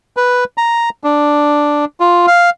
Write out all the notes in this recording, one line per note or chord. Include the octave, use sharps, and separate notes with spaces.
B4
A#5
D4
F4
F5